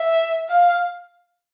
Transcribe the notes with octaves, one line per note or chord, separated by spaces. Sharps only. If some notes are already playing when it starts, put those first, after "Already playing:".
Already playing: E5
F5